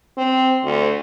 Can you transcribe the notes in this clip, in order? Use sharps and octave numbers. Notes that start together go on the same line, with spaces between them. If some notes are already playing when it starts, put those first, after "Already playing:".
C4
D2